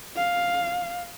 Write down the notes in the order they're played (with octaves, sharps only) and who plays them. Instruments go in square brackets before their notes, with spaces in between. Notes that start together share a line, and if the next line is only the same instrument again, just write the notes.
[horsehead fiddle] F5